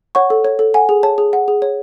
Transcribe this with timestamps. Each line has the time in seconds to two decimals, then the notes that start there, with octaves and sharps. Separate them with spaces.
0.15 C#5 F#5 C#6
0.30 A4
0.45 C#5
0.59 A4
0.74 F#5 G#5
0.89 G#4
1.03 C#5 A5
1.18 G#4
1.33 F#5
1.48 G#4
1.62 C#5